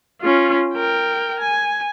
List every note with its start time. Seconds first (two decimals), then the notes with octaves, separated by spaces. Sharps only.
0.22 C#4 F4
0.75 A#4 G5
1.40 G#5